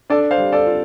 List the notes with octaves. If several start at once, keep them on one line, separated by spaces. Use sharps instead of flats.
D4 A4 D5
C5 F5
G3
A4 D5
F4